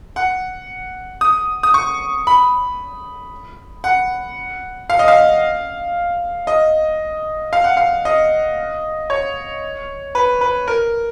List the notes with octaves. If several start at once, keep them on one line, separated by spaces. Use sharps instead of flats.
F#5
D#6
D#6
C#6
B5
F#5
F5
D#5
F5
D#5
F5
F#5
F5
D#5
C#5
B4
B4
A#4